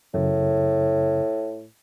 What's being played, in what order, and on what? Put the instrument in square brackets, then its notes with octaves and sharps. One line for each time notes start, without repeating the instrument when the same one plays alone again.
[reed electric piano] F#2 C#3 [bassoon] A2